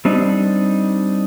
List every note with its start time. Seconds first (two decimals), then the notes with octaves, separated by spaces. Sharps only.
0.05 G3 C4 D4 D#4